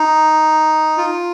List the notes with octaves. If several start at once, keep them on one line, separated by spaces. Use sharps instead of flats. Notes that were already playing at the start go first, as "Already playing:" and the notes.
Already playing: D#4
F4